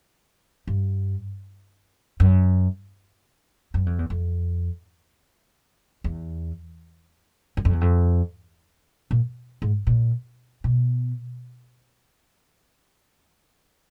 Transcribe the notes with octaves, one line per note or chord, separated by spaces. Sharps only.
G2
F#2
F#2
F2
E2
F2
E2
F#2
F2
E2
F2
A#2
G#2
A#2
B2